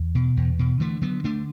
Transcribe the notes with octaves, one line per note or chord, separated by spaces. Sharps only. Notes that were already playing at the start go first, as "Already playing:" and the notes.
Already playing: E2
B2
E2
B2
D3 E3 A3
D3 F#3 B3
D3 A3 D4